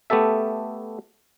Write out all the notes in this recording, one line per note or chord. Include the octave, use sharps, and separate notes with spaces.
A3 B3 G4 A4 E5